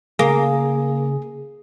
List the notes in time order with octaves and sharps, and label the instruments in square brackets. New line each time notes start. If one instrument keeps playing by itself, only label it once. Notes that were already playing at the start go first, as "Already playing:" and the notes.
[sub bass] C#3 [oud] A#3 [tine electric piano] G#4